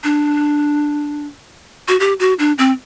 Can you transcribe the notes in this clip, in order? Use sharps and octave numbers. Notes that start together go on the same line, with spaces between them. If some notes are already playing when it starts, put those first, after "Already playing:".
D4
F#4
G4
F#4
D4
C4